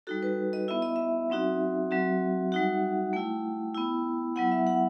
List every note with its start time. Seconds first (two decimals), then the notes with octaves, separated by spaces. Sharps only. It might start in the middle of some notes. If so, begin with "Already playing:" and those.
0.07 G3 D#4 F#4 A4
0.23 B4
0.53 D#5
0.68 B3 E4 E5
0.82 D#5
0.96 E5
1.30 F#3 C4 D#4 F#4
1.91 F#3 C4 F#4
2.52 G3 D#4 F#4 F#5
3.13 A3 E4 G5
3.75 B3 E4
4.36 F#3 B3 E4 F#5
4.52 E5
4.67 F#5